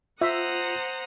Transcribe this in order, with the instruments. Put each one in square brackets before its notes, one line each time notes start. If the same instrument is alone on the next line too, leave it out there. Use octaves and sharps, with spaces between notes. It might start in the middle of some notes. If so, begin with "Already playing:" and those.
[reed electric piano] F4 [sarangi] C5 [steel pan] E5 [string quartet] F#5 A#5 D#6